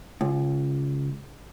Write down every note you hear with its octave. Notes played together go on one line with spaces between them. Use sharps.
C#2